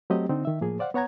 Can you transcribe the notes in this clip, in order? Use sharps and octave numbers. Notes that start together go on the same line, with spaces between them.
F#3 A3 C4 G4 D#5
D3 C4 D#4
D#3 E5
A2 F3 A#3 G#4
C5 D5 F5 F#5
B3 C#5 F#5 A#5 G#6